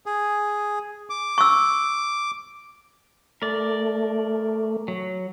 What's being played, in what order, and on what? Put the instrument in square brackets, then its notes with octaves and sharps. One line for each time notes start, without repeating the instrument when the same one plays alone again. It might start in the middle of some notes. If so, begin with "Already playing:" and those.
[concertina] G#4
D6
[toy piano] C#6 E6
[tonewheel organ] A3 [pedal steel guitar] A#4 D5
[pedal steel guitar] F#3